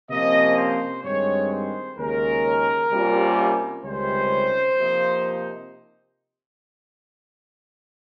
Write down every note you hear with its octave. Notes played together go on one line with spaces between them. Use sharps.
C3 F3 A#3 C#4 D#5
C5
G2 D#3 G#3 C4 C#5
C5
D#2 C#3 G#3 C#4 A#4
C3 G3 A#3 C#4 F4
C#2 C3 D#3 G3 C#4 C5
C3 F3 A#3 D#4